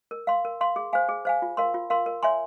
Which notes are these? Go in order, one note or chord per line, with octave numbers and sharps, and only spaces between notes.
A#4
F5 C6
A#4
F5 C6
G#4
C5 F5 G#5
G#4
C5 F5 G#5
F4
A#4 F5 C6
F4
A#4 F5 C6
A#4
C#5 E5 G#5 C6